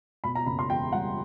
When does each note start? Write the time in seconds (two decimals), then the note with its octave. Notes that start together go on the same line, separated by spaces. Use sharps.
0.24 B2 B5
0.35 A#5
0.46 F#1 B5
0.59 C6
0.70 E2 G5
0.92 G3 F#5